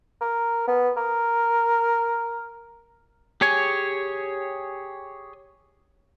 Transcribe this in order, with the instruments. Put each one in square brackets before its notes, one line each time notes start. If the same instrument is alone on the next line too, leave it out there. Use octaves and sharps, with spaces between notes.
[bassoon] A#4
B3
A#4
[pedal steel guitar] G4 G#4 C#5 G#5